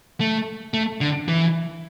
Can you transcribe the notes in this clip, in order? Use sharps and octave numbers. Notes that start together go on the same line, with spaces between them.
A3
A3
D3
E3